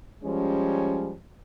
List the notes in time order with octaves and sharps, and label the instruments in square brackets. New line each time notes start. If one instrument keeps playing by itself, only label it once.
[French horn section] F3 G3 G#3 C#4